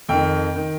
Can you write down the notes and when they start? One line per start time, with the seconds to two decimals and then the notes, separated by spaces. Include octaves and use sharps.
0.09 F2 D#3 G5
0.56 D#3